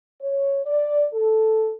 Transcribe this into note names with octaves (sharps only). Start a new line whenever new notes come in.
C#5
D5
A4